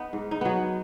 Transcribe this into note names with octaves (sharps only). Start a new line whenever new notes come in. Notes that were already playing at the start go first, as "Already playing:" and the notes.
Already playing: B3 D#4
G#2
D#4
F#3 B3